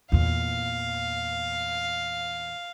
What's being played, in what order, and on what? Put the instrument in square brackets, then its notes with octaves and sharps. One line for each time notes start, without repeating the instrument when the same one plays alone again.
[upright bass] E2 A#2 [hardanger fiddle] F5